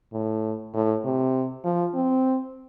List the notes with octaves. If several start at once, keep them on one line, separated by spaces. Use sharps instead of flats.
A2
A2
C3
F3
C4